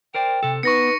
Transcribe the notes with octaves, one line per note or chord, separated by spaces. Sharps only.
A#4 C5 D5 G5
C3 A4
B3 D#4 B4 C#6 A#6 C#7